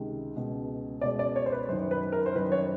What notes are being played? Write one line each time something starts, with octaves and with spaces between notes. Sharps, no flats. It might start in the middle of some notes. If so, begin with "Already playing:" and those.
Already playing: C#2 C3 D#3
C#2 B2
C#2 B2 D5
D5
C#5
C5
B4
F#2 D#3 C5
B4
A#4
C5
F#2 D#3 B4
C#5